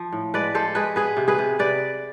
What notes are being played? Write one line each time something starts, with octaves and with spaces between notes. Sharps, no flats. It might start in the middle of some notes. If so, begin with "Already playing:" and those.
Already playing: F3
A2
G#3 B4 D5
G#3 A4 C5
G#3 G#4 B4
B3 G#4 B4
C3
G#4 B4
C3
C3 B4 D5